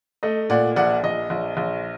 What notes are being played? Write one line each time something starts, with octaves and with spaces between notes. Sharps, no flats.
A3 D#5
A#2 D5 F#5
A#1 D5 F#5
A#1 D#5
A#1
A#1